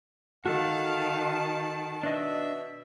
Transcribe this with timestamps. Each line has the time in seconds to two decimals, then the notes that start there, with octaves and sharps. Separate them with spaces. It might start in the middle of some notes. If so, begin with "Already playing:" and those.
0.46 D#3 F#4 A4 F5 A5
2.03 B2 D4 D#5 E5